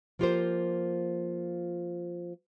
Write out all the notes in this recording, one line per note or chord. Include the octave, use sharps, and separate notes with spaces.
F3 A#3 F4 G4 A#4 C5